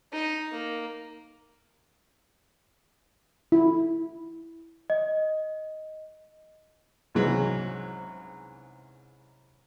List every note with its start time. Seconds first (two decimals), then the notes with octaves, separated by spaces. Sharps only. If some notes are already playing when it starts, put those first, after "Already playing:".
0.13 D#4
0.51 A#3
3.52 E4
4.90 D#5
7.15 C2 G#2 C#3 E3 F#3 G#3